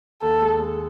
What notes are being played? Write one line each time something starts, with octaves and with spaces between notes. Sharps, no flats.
D#2 A4
G#3
G#3